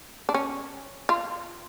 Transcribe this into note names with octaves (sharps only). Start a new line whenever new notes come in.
D4
C#4
F4